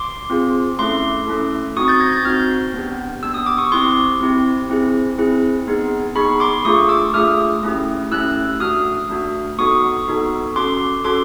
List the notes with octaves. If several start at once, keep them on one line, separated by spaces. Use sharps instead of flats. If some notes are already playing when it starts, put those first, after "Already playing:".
Already playing: C6 D6
C4 F4 G#4
A3 C#4 E4 A4 C6 D6
A3 C#4 E4 A4
C4 D#4 F#4 C#6 D#6
G6 A6
G#6 A#6
G6 A6
C4 D#4 F#4 F6 G6
B3 D4 G4
B3 D4 G4 E6
D#6
D6
C#6 D#6
C4 E4 G4 C6 D6
C4 E4 G4
C4 E4 G#4
C4 E4 G#4
B3 D#4 G#4
B3 D#4 G#4 B5 C#6
C6 D6
A3 D4 F4 G#4 C#6 D#6
D6 E6
A3 D4 F4 G#4 D#6 F6
A3 C#4 E4 G4
A3 C#4 E4 G4 E6 F#6
A3 D4 F#4 D#6 F6
A3 D4 F#4
B3 D#4 F#4 A4 C#6 D#6
B3 D#4 F#4 A4
C#4 F#4 A4 C6 D6
C#4 F#4 A4 C6 D6